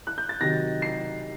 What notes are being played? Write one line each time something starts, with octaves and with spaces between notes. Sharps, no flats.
F#6
G6
A6
C3 D#3 F#3 A#6
C7